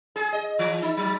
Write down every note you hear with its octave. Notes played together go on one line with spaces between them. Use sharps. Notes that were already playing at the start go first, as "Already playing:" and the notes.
G#4
D#5
E3
D#4
F#3